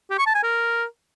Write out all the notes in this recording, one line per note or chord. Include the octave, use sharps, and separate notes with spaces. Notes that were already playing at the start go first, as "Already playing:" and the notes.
G4
C#6
A5
G#5
A#4